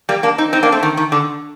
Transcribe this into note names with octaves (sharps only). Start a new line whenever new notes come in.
G3 A#3
A#3 D4
C4 D#4
C4 D#4
A#3 D4
A3 C4
D#3
D#3
D3